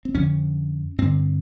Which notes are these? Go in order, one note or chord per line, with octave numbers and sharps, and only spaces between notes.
C4
F2 D3 C#4
G2 D3 C4